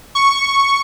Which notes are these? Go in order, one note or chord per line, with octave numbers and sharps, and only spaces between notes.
C#6